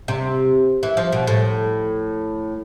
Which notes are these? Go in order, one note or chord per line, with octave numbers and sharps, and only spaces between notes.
C3
E3
F3
B2
A2